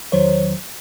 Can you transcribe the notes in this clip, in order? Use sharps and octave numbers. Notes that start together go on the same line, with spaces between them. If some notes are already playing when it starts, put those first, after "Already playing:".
E2 D#3 F#3 C5 C#5